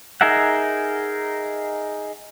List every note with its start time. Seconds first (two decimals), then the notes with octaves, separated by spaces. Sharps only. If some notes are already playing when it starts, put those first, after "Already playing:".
0.21 D#4 G#4 A#4 E5 F#5